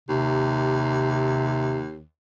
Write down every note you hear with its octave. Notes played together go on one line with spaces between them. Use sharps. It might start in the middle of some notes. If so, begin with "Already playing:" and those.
D#2 C3